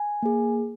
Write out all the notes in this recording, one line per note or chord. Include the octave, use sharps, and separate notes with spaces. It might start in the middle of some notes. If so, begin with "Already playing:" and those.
Already playing: G#5
A#3 G#4